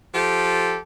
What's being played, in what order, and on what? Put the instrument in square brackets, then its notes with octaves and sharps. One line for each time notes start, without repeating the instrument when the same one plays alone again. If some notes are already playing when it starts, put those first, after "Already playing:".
[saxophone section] F3 G4 A4